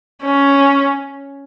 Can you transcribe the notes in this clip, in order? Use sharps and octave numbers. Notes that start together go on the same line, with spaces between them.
C#4